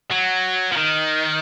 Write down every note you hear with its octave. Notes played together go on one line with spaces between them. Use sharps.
F#3
F3
D#3